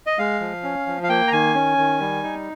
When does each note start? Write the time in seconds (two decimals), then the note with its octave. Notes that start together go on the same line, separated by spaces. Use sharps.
0.07 D#5
0.18 G#3 F5
0.40 F3
0.63 C#4
0.86 F3
1.03 F5
1.09 A#3 G5
1.28 A#5
1.32 D#3 G#5
1.54 C#4
1.78 D#3
2.00 G3
2.23 D#4